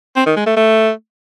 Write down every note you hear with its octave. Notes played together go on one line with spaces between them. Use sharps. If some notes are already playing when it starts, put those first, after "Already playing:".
C4
D#3
G#3
A3
A3